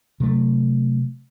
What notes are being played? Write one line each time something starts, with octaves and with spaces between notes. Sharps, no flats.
C3 F#3 A3